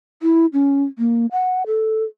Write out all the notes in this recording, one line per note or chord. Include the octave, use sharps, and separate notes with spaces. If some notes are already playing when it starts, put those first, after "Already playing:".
E4
C#4
A#3
F#5
A4